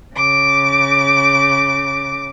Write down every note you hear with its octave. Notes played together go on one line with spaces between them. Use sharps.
C#3 D6